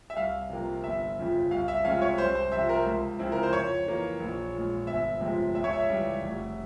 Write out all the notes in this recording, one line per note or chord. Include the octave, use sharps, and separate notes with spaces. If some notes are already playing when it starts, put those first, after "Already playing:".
E5
C2 F5
C3 F3 A#3
G1 E5
F2 C#3 F3
C2 F5
E5
C3 F3 G#3 C#4 F5
C#5
C2 C5
C5
C3 F3 E5
A#4
C#2
C#3 F3 C4 E4
A#4
C5
F2 C#5
E3 A#3
A#1
A#2 G#3
G1 E5
F2 C3 F3 G#3
C#2 E5
C#5
E5
C#3 E3 G3
F1